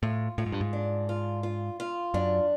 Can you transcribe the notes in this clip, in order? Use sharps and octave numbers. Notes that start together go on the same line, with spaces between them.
A2 F4
A2 F4
G#2
G2
G#2
D4
F4
F4
F4
F#2 D4